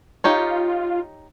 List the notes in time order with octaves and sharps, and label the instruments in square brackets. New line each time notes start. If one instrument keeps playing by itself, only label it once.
[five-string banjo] D#4 G4 C#5 [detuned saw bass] F4